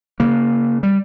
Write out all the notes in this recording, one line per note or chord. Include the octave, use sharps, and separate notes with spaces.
C#3 A#3
G3